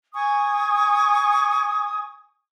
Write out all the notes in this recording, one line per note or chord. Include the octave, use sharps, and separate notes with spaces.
G#5 C#6 D#6